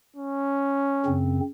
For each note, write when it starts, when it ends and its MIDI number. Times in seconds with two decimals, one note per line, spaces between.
0.16 1.18 61
1.06 1.40 42
1.06 1.40 49
1.06 1.40 60